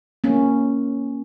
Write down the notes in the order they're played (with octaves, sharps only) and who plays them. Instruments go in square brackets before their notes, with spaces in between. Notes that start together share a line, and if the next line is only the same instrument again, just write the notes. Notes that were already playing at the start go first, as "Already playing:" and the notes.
[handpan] A#3 C#4